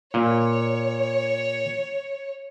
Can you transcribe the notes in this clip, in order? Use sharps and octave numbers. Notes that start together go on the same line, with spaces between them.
A#2 C#5